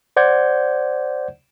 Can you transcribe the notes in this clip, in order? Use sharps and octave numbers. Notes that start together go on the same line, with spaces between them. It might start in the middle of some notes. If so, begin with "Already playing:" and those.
C5 D5 F#5 G6 G#6